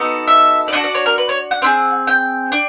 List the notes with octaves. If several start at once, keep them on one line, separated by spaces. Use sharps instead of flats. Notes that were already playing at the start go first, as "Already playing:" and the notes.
Already playing: B3 D#4 F#4 A4
E5
D5
D4 F#4 A4 D#5
D5
C#5
A#4
B4
C#5
F#5
C4 E4 G#4
G5
D4